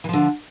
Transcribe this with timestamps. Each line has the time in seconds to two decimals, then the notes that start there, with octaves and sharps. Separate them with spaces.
0.04 E3
0.09 F3
0.13 D3